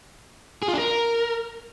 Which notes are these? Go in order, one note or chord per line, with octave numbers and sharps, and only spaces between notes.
G#4
F4
D4
A#4